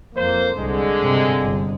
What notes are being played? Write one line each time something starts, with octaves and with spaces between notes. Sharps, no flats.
F2 A#3 C5
C2 D3 G#3
G2 C3
G1